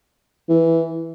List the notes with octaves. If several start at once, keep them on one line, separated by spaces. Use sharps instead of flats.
E3